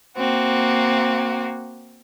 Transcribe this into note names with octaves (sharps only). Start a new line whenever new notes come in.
A#3 C4 F#4